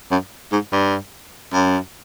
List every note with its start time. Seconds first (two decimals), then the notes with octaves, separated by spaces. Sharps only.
0.11 F#2
0.52 G#2
0.72 G2
1.53 F#2